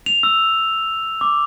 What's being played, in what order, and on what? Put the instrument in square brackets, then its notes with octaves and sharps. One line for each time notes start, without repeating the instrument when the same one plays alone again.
[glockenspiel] F7
E6
D6